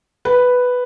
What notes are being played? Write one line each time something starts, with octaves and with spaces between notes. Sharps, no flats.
B4